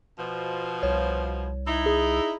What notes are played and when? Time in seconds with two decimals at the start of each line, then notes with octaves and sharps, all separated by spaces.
0.19 B2 F3
0.83 C2 C#5
1.67 D#4 E4
1.86 G#4